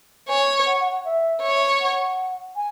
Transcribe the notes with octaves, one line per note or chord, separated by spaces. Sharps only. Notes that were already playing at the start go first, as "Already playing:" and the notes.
C#5 G#5
F#5
F#5
F#5
E5
C#5
F#5
G#5